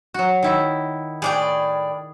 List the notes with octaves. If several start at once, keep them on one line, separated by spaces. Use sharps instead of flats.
F#3 F#4
D#3 E4
A2 G#4 D5 G5